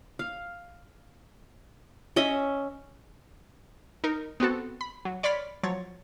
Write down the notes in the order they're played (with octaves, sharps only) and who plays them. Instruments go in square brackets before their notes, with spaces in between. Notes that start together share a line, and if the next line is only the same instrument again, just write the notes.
[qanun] F5
C#4 D#5 E5
[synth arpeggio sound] D#4 A#4
B3 C4 F#4 A4
B5
F#3
C#5 D5 B5 C6 F6 B6
F3 F#3 C#5 A6